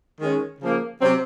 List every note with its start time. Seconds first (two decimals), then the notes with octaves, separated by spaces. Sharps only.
0.21 D#3 G#3 C#4
0.61 C#3 F3 A#3
1.00 C3 F#3 C4